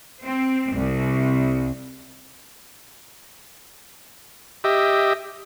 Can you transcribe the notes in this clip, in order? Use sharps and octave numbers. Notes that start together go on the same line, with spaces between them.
C4
C2
G4 D#5 E5